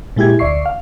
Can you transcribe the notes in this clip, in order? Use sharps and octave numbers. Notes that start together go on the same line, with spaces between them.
A#2 G#3 E4 G4 G#6
D2 D5 E5 C#6 C7
F5